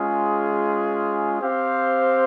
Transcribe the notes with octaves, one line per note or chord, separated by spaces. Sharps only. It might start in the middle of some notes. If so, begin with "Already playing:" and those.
Already playing: G#3 C#4 F4 G#4
C4 G4 C5 F5